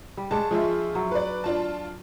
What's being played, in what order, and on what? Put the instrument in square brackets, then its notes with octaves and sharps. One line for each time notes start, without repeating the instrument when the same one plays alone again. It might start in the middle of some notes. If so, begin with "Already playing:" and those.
[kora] G3
[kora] G#3 D4 C#5 [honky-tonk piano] A5
[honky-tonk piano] F3 F4 E5 [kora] G#3
[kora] F#3
[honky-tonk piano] B4 D5
D4 F4 A5